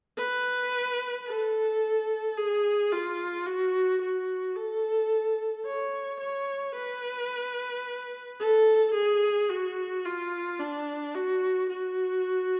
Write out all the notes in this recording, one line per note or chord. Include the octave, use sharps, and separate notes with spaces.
B4
A4
G#4
F4
F#4
F#4
A4
C#5
C#5
B4
A4
G#4
F#4
F4
D4
F#4
F#4